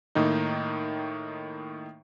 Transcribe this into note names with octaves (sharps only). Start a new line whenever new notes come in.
A2 D#3 A#3 D#4